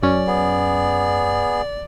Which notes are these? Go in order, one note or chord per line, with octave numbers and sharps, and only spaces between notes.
F#2 C#4 D5
B3 G#4